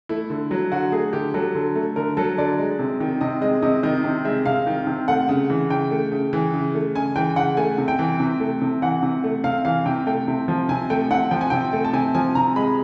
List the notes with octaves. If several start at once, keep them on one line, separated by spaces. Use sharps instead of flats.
A3 E4
D3
F#3
D3 F#4
A3 G#4
D3 G4
F#3 A4
D3
A3
D3 A#4
F#3 A4
D3 D5
G#3
C3
D#3
C3 D#5
G#3 D#5
C3 D#5
D#3 D#5
C3
G#3 E5
C3 F5
D#3
C3
A3 F#5
C#3
E3
C#3 G5
A3
C#3
E3
C#3
A3
C#3 G#5
E3 G5
C#3 F#5
A3 G#5
C3
G5
E3
C3
A3
C3
E3 F#5
C3
A3
C3 F5
E3 F5
C3 G5
A3 G5
C3
F3
C3 G#5
A3 G5
C3 F#5
F3 G5
G#5
C3 G5
A3
A5
C3 G#5
F3 G#5
C3 A#5
G#3 B5